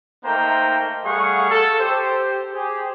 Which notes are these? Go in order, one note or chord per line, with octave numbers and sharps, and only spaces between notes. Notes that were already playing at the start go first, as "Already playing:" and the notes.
A3 A#3 D#4 C5 G5 A#5
G3 A3 G#4 F5 F#5 C#6
A4
G4 C5
G4 G#4 C5